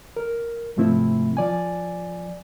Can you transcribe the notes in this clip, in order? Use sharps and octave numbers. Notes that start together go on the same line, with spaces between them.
A#4
G#2 C3 F3 A3 C4 E4
F3 D5 G#5